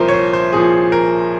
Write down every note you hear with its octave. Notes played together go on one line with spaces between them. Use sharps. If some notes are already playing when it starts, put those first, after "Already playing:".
Already playing: C2 A#2 F3 A#4 C5
C#5
C5
C5
C2 A#2 F3 G#4
A#4